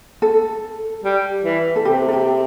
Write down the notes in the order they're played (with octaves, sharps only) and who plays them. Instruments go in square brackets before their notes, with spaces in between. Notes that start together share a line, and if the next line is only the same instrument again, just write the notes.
[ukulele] A4
[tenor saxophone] G3
E3
[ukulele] A4
[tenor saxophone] C3 [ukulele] G4
[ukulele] A4
G4